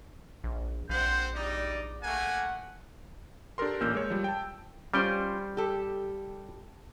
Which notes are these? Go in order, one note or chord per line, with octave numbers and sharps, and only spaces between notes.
A#1
A#1 C4 C5 F#5 G6
G3 D#4 D5
A3 A#3 F#5 G#5
D4 G4 A4 A#4 C6
A1 A#2 A#3 C#4 E6 G6
G#3 A#4 C#5
F3 G3
G5 A5
G3 C#4 F4 C5 G5
G4 A4